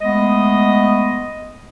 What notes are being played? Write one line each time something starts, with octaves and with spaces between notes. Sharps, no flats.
G#3 A3 B3 D#5